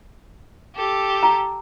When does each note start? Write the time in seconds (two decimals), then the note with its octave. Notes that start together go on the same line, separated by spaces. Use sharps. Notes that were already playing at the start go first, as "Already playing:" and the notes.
0.74 G4 A4
1.23 A#5